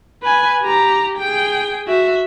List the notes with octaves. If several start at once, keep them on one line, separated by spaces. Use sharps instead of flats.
B4 G#5
G4 A#5
G#4 G5
F#4 E5